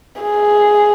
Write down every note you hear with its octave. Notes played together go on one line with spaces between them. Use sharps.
G#4